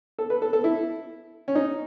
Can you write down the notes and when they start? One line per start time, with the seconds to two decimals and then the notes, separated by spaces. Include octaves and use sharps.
0.19 A4
0.30 B4
0.42 A4
0.53 A4
0.64 E4
1.48 C#4
1.55 D#4